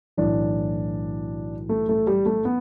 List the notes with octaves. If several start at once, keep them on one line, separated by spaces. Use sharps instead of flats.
B1 A2 E3 D4
A3
A3
G3
A3
B3